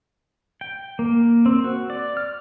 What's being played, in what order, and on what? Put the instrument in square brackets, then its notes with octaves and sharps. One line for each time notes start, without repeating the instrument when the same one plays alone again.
[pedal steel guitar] G5
A#3
C4
F#4
D5
F6